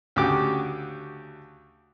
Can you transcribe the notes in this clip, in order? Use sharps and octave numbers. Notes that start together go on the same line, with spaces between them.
D2 C#3 F#4 G4 D6